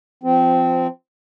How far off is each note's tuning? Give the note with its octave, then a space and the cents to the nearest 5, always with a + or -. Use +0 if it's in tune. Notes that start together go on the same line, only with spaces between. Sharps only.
F3 -5 C4 -15